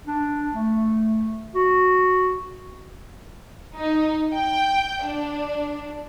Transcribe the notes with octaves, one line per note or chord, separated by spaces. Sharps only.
D4
A3
F#4
D#4
G5
D4